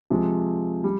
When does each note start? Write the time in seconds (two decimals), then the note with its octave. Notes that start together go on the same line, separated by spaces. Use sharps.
0.10 C3 F3 G#3
0.84 G3